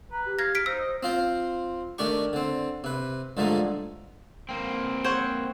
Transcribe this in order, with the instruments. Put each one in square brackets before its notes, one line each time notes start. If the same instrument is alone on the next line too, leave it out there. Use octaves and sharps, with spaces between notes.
[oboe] B4 [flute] A#5
[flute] G4
[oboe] F5 [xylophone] G#6 A#6
[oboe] F5 [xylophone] B6 D7
[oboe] D#4 [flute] C5 [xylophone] E6
[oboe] D#5
[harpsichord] C4 F4 C5
D#3 A3 D4 G4 C#6
D3 C4
C3 B4
G2 D3 F3 G#3 A3 D#4
[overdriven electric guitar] A#3 C4
[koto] C5 C#5 F#5